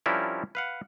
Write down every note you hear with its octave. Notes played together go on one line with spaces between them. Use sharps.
F3 G3 C#4 D4 E4 A#4
B4 F5 F#5